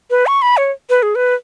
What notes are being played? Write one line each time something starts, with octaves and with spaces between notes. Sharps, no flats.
B4
C#6
B5
C#5
B4
G#4
B4